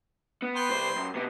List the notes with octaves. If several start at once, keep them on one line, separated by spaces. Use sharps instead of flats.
B3
B4 G5 C6
C2 C5
F#2
C3 B3